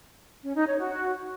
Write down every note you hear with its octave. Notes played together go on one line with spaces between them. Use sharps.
C#4
D#4
C#5
F#4